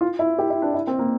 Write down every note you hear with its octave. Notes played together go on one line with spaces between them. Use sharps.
F4
E4
G4
E4
D4
E4
C4
A#3